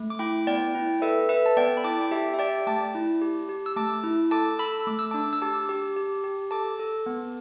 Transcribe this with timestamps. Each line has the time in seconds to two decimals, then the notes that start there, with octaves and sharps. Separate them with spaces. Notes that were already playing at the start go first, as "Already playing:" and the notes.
Already playing: A3
0.10 D6
0.19 E4 G5 B5
0.47 B3 D5 G5
0.75 E4
1.02 A4 B4 E5
1.29 A4 B4 E5
1.46 A5
1.57 B3 D5 G5
1.77 B5
1.84 E4 A5 D6
2.01 G5
2.11 G4 E5 A5
2.34 E5
2.39 G4 D5 G5
2.67 A3 A5 D6
2.95 E4
3.21 G4
3.49 G4
3.66 E6
3.76 A3 A5 D6
4.04 E4
4.31 A4 A5 D6
4.59 A4 B5 E6
4.87 A3 D6
4.99 E6
5.11 D4 A5 D6
5.33 E6
5.42 G4 A5 D6
5.69 G4
5.96 G4
6.24 G4
6.51 A4 A5 D6
6.79 A4
7.06 B3